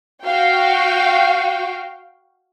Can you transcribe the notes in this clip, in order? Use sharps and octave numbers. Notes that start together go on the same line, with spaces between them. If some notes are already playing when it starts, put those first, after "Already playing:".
F#4 F5 G5